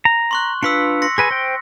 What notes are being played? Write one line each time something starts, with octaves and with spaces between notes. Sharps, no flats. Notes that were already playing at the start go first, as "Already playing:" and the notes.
A#5
C6 C#6 F#6
D4 F4 B4 E6 B6 C#7
C6 A#6 C#7
G#4 B4 G#5 A#6
C5 G5